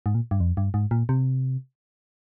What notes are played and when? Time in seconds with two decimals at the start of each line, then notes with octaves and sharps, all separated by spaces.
0.06 G#2
0.15 A#2
0.31 G2
0.40 F2
0.57 G2
0.74 G#2
0.91 A#2
1.09 C3